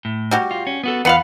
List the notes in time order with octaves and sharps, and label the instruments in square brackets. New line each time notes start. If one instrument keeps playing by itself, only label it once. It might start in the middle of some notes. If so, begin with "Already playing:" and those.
[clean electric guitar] A2
[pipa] G3 F#4 G4
[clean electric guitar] F4
C#4
B3 F#4 A4
[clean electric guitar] E2 F#5 B5 [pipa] B3 F4 F5